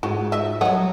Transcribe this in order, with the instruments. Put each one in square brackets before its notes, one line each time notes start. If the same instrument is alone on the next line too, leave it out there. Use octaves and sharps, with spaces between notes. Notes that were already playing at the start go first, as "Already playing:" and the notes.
[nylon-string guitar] G#2 D#4 F4 [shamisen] F#4
[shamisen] D#5 E5
[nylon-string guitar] F#3 G3 [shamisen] C#5 D#5 F#5